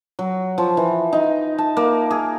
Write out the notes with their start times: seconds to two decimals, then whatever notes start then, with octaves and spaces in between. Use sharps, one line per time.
0.19 F#3
0.58 F3
0.77 E3
1.13 D#4
1.58 A5
1.77 A#3
2.10 G#4